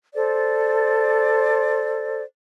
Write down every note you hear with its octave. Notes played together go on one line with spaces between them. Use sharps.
A4 C5 D5